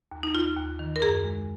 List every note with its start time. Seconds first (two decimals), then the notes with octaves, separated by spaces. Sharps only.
0.12 D#2
0.23 D#4
0.35 D#2 F4
0.57 D#2
0.79 D#3
0.96 A#4
1.02 F#2 G#4
1.24 G#3